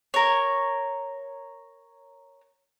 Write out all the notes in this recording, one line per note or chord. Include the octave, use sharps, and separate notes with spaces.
A#4 C#5